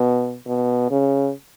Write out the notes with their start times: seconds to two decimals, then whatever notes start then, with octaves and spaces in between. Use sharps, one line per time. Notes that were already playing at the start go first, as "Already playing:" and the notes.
Already playing: B2
0.47 B2
0.91 C#3